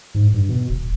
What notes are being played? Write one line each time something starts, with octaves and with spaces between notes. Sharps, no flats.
G#2
G2
B2
D#1